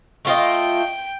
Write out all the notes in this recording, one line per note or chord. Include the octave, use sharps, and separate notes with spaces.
A3 F4 D#5 G5